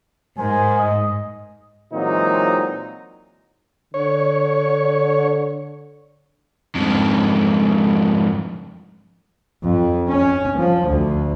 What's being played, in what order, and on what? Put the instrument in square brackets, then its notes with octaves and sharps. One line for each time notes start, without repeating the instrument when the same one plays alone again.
[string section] G#2 [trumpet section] A#4 C5 G#5
[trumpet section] D#5
[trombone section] A#2 E3 F#3 G#3 C4 D#4
[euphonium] D3 [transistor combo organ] C#5
[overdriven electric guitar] F2 G#2
[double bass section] F2
C#4
F3
D2